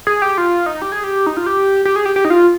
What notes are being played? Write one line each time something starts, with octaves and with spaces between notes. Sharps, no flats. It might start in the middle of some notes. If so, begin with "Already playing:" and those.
G#4
G4
F4
D#4
G4
G#4
G4
D#4
F4
G4
G4
G#4
G4
G4
D#4
F4